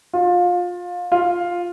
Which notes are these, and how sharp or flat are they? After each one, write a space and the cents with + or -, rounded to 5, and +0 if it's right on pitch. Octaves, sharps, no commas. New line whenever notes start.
F4 +25
F4 +5